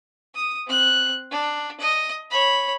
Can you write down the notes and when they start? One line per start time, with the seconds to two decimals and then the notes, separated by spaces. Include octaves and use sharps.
0.35 D#6
0.67 C4 F#6
1.31 D4
1.80 D#5
2.30 C#5 B5